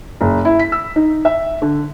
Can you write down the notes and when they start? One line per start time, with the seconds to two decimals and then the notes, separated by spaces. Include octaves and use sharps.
0.21 F#1
0.45 E4
0.59 B6
0.72 E6
0.96 D#4
1.25 E5
1.62 D3